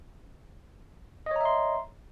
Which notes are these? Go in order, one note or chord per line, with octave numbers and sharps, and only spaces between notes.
C#5 D#5 E5 A#5 C6